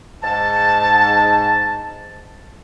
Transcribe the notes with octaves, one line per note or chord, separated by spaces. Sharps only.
G#2 A5